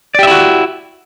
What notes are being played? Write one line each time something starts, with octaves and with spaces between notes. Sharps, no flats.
E4 F#4 G4 D5 E5